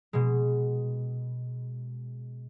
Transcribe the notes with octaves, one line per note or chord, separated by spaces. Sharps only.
B2 G#3